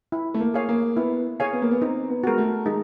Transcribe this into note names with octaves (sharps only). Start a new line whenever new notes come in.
E4
A3
A#3
G#4 C#5 F5 G#5
A#3
B3 E4
G#4 C#5 F5 G#5
B3
A#3
B3
C4 D#4
B3
G#3 F#4 A#4
A3
G#3 D#4